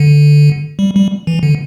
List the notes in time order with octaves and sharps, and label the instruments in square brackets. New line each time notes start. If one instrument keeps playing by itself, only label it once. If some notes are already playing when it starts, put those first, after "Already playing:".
Already playing: [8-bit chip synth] D3
G3
G3
E3
D3